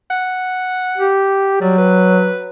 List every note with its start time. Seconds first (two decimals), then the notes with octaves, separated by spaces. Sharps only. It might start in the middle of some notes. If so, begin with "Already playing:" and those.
0.11 F#5
0.98 G4
1.62 F#3 G3
1.78 B4